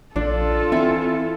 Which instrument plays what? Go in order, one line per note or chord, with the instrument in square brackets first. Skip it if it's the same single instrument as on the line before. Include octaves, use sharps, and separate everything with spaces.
[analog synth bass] A#1 [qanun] F3 [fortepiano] D4 [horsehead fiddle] F4 A4
[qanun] E3 D6 [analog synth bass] C4 [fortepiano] E5